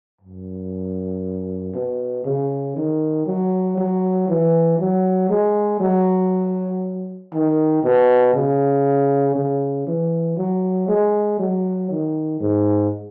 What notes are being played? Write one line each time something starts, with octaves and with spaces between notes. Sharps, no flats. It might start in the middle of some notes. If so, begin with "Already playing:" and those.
F#2
B2
C#3
D#3
F#3
F#3
E3
F#3
G#3
F#3
D#3
B2
C#3
C#3
E3
F#3
G#3
F#3
D#3
G#2